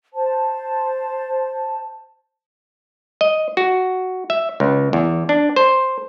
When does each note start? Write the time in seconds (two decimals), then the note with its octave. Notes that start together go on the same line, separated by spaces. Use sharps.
0.14 C5 A5
3.21 D#5
3.57 F#4
4.30 E5
4.60 C#2
4.93 E2
5.29 D4
5.56 C5